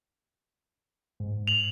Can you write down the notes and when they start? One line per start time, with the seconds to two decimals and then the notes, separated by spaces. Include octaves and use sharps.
1.20 G#2
1.48 F7 F#7